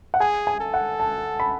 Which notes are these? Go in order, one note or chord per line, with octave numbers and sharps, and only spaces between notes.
F#5
G#4 G#5
G#5
A4
F#5
A5
B5